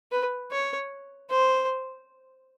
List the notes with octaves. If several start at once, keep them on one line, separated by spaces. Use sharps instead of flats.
B4
C#5
C5